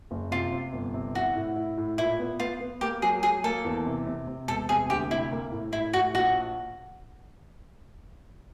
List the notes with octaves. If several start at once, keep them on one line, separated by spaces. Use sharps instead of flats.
F#1
C3 F4
C3
G1
C3
E4 F#4
A2
E4
A2
A#2 E4
B3
B3 F4
B3
A#3 G4
F#3 G#4
F#3 G#4
A#3 A4
E2
C3
C3
C3
E1 A4
C3 G#4
D2 G4
C3 E4
A#3
A2
A2 E4
A2 F#4
A#1 F#4